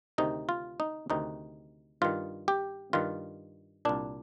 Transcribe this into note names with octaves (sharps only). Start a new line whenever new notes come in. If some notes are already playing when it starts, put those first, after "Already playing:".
D2 C3 D#3 D#4
F4
D#4
D2 C3 D#3 D#4
G2 D#3 F4
G4
G2 D#3 F4
C2 A#2 D4